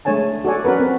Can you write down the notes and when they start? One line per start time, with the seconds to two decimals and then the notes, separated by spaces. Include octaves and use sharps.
0.05 G#3 A3 D4 C#5 G#5 A5
0.45 F#4 A4 D5 G#5
0.65 C#4 F#4 A#4 B4
0.79 C4